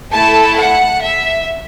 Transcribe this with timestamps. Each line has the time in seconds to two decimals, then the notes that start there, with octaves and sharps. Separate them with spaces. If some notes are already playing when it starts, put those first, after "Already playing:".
0.14 A3 E4 A4 A5
0.59 F#5
1.03 E5